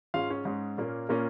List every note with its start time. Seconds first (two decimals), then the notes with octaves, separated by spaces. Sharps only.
0.14 G#2 G#3 C#4 F4 F5
0.30 C#4 C#5
0.45 G#2 G#3 C#4
0.78 A#2 A#3 C#4
1.09 A#2 A#3 C#4 A#4